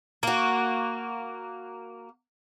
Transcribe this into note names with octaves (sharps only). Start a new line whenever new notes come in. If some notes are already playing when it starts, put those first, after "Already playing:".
A#3 F#4